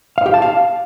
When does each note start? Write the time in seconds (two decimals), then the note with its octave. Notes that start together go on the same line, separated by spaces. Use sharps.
0.18 F5
0.26 G4
0.34 A5
0.42 F5